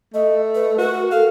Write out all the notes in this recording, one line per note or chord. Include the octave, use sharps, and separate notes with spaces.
A3 D#5
B4
F#4 A#4
A4 F5